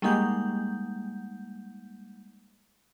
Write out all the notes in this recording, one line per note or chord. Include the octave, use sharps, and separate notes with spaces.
G3 G#3 A#3 D#4 F#5 G6